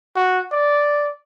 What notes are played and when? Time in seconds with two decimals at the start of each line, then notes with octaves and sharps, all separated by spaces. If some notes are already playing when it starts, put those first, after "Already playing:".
0.16 F#4
0.52 D5